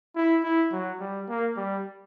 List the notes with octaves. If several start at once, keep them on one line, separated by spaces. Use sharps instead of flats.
E4
E4
F#3
G3
A#3
G3